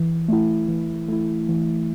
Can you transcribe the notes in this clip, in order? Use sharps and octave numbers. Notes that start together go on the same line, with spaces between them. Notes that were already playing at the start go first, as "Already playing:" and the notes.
Already playing: E3
A3 E4
E3
A3 E4
E3